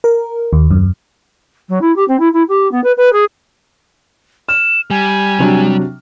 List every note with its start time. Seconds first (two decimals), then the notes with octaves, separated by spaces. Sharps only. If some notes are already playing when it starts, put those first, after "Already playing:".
0.04 A#4
0.53 D#2
0.71 F#2
1.69 F#3
1.81 E4
1.96 G4
2.08 C4
2.20 E4
2.34 E4
2.49 G4
2.72 B3
2.84 B4
2.97 B4
3.13 G#4
4.49 F6 E7
4.90 G3 G#5
5.39 C3 F#3 D4